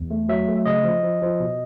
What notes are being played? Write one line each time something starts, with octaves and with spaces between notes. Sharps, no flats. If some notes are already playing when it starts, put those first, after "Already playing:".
Already playing: E2
A3
F#3 E5
A3
C#3 D#5
F3
F3
F3
B2